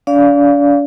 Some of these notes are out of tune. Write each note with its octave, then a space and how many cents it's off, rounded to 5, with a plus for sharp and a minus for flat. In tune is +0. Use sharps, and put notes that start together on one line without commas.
D4 -45 D5 -25 F5 +0